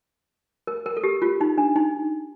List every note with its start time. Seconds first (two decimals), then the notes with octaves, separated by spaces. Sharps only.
0.67 A#4
0.86 A#4
0.97 A4
1.03 G4
1.22 F4
1.41 D#4
1.58 D4
1.76 D#4